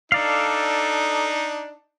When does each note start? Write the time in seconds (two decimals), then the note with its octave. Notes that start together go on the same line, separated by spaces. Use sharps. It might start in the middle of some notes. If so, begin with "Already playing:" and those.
0.12 D4 D#4 A4 D5 F5